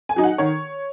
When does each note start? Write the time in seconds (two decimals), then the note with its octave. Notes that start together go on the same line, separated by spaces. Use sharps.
0.09 G#5
0.16 F#3 D#4
0.23 F#5
0.38 D#3 C#5